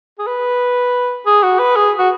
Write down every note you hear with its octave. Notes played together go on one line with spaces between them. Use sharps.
G#4
B4
G#4
F#4
B4
G#4
F#4